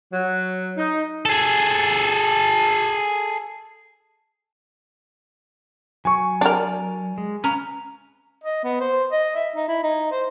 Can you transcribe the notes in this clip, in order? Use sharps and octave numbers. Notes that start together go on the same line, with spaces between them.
F#3
D#4
G#4 A4
F#3 G#5 C#6
D4 A#4 D5
G#3
C#4 B4 C#5 F5 A#5
D#5
B3
C5
D#5
E5
D#4
E4
D#4
C5